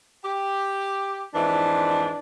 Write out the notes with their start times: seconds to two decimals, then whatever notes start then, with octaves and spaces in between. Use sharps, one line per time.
0.24 G4
1.34 F2 G#2 E3 D4